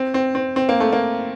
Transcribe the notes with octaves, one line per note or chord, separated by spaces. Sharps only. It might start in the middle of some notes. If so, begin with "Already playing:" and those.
Already playing: C4
C4
C4
C4
A#3
A3
A#3